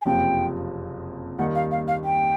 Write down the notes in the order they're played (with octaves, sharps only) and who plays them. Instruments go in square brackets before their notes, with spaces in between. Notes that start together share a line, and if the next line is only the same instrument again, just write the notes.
[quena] G#5
[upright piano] F#1 F2 C3 F3 [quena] G5
[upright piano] D#2 D#3 G3 [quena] F#5
[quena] F5
F5
F5
G5